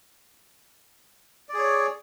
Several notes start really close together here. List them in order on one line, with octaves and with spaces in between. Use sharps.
D5 G#4 C#5